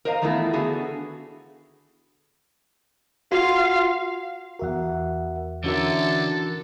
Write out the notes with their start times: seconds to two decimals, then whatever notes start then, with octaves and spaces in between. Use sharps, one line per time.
0.05 A#4 C5 D#5 F5 A#5
0.22 D#3 E3 A3 B3 E4 F4
0.53 D3 B3 F#4 G#4 A4
3.32 F4 F#4 F5
4.59 E2 F#4 A#4 E5 F#5
5.64 D3 E3 C#4 F#4 A4 A#4 E5